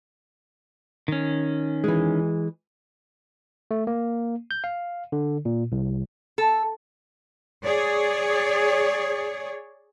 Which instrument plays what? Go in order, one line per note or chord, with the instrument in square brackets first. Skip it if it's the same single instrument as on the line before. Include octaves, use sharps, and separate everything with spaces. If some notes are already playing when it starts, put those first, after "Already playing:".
[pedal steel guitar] D#3 C#4
[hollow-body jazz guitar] E3 G#3
[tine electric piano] A3
A#3
G6
F5
D3
A#2
C2
[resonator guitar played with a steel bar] A4
[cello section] G#4 C#5 D5